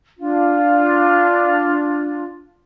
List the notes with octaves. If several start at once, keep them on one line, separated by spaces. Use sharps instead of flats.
D4 F4